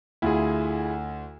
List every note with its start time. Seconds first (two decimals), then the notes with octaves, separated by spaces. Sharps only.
0.22 D2 E4 F4 G#4